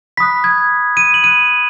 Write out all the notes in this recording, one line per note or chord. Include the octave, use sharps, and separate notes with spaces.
B5 D#6 F#6 B6
G#6
D#7
F#7
B5 F#6 D#7